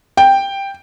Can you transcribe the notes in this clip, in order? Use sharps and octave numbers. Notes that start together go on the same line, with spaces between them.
G5